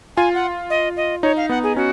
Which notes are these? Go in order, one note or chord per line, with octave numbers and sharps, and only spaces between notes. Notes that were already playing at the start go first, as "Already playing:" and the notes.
F4 G#5
F#5
D#5
D#5
D#4 C#5
F5
B3 F#5
G#4
C#4 F#4